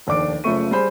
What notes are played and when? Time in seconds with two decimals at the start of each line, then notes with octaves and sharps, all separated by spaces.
0.07 F1 D#2 D4 D6 D7
0.44 F#1 C#3 F3 A3 C#6 D#7
0.71 G3 G#4 C5 B5